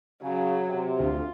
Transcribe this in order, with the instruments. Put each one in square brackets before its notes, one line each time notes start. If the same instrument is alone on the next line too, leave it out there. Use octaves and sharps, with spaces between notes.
[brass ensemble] C#3 [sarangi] F#3
[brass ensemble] C3
[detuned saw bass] D2 [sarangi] F4